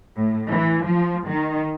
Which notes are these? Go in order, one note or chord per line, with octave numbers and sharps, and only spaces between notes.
A2
E3
F3
D#3